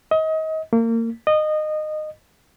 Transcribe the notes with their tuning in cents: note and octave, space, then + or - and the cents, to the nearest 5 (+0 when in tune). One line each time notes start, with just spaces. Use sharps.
D#5 +30
A#3 -30
D#5 -20